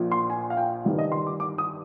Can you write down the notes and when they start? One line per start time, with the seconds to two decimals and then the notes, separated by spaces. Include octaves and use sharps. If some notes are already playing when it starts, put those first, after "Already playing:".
Already playing: A#1 A#2 F3
0.12 C6
0.30 G#5
0.50 F5
0.57 G5
0.85 G1 G2 D#3
0.98 D#5
1.12 C6
1.27 D6
1.40 D6
1.58 D#6